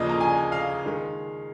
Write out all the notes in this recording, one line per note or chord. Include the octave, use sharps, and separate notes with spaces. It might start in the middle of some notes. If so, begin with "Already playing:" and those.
Already playing: D#2 C#3 F3 A#3 D#5
A#5
G#5
F5
D#3 G#3